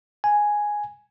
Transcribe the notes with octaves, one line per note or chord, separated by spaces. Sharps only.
G#5